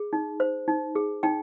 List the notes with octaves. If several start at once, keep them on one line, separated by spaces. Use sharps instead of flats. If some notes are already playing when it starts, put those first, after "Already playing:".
Already playing: G#4
D#4
C5
D#4
G#4
D#4 G5